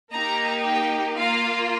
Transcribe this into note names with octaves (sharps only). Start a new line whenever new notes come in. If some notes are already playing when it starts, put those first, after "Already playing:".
A#3 D#4 G4 A#5
G5
A#3 F4 F5